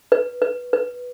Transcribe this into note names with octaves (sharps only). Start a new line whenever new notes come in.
B4
B4
B4